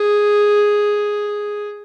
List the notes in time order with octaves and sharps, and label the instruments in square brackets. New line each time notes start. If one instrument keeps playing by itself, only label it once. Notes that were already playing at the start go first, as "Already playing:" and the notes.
Already playing: [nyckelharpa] G#4